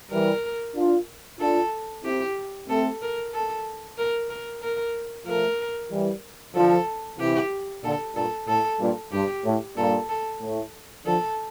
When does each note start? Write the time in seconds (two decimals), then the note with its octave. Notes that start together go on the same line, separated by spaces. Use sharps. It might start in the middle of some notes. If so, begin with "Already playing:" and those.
0.11 E3 G3 A#4
0.75 D4 F4
1.40 D4 F4 A4
2.05 C4 E4 G4
2.68 A3 C4 A4
3.02 A#4
3.34 A4
3.98 A#4
4.29 A#4
4.62 A#4
5.26 F3 A3 A#4
5.91 E3 G3
6.55 D3 F3 A4
7.19 C3 E3 G4
7.84 A#2 D3 A4
8.15 G2 A#2 A4
8.48 A2 A4
8.80 G2 A#2
9.12 G2 G4
9.45 A2
9.77 G2 A#2 A4
10.09 A4
10.41 A2
11.06 D3 F3 A4